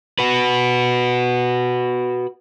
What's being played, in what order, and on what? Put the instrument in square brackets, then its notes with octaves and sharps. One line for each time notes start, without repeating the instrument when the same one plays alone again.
[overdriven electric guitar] F#4 B4